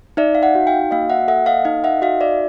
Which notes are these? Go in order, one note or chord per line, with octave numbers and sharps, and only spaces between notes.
D#4 D5 E5
F5
E5 F#5
F#4
F5 G5
A#3 D#5 F5
E5 F#5
A4 E5 F#5
D#5 F5
D#4 D#5 F5
E5 F#5
F#4 D#5 F5
D5 E5